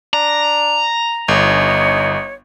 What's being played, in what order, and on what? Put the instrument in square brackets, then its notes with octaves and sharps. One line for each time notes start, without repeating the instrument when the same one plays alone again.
[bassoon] D4 [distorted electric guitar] A#5
[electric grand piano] G1 [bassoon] D#4 [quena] C#5